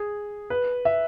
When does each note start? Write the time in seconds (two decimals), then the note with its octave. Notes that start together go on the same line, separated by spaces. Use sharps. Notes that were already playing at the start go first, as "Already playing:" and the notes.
Already playing: G#4
0.50 B4
0.85 E5